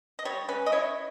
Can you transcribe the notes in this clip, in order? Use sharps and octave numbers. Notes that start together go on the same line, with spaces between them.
D#5
G3 C#5
C#4 B4
D#5
E4 C#5